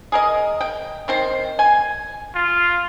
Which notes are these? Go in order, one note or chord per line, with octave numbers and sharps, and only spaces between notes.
G#4 A#4 D#5
G5
D#3 C4 C5
G#5
F4